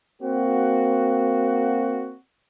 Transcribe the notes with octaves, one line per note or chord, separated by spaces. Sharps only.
A#3 C4 F#4